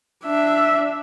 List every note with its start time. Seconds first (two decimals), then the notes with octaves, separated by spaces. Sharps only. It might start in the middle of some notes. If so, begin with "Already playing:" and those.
0.25 D4 E5